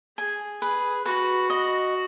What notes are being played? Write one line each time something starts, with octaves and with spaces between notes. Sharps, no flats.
G#4 G#5
G#4 B4
F#4 B4
D#5